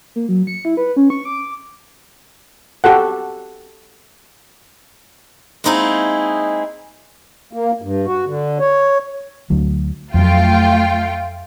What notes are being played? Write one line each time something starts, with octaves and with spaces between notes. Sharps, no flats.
A#3
F#3
C#7
E4
B4
C#4
C#6
D6
F#4 G4 A4 F#5
G#3 A#3 C4 D#4 E4 G#4
A#3
G2
F#4
D3
C#5
D2 F#3
F2 F#3 A3 F4 G5